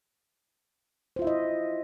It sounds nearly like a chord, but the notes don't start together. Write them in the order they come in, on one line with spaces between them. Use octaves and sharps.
C5 F4 E5 E4 D#5